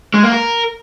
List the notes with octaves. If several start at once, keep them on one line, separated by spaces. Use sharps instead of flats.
G#3
A#3
A#4